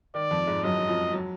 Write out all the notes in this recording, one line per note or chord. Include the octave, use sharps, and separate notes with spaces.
D#3 D5
F2 F3
G#2 G#3
F#2 F#3 D#5
F#3
F2 F3
F#3